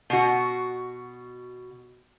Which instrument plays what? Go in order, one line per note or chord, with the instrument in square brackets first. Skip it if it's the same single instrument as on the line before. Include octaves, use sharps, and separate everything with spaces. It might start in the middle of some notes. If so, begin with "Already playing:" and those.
[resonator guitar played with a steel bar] B2 F#4